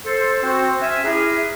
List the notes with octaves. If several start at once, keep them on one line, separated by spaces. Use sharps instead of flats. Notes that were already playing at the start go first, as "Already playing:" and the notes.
A4 C5
C4 F#4 C5
C#4 E5 G#5
E4 G4 G#4 A#4 B4 E5